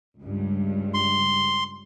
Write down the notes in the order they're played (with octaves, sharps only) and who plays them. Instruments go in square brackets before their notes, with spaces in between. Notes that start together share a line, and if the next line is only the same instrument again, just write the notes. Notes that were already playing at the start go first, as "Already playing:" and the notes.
[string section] C#2 G2
[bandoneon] C6